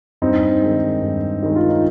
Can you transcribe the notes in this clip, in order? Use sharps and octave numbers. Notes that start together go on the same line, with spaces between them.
G2 C4 D#4
D#3 G#3
G2
D#3 G#3
F4
D#4